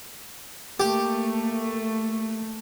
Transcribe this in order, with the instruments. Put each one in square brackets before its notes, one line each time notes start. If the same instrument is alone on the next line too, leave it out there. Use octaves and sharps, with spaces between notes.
[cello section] A3 [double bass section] A#3 [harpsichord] G4